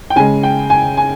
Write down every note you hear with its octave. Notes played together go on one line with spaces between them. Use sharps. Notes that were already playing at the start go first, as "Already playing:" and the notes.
G5
C#3 G#3 G#5
G5
G#5
G#5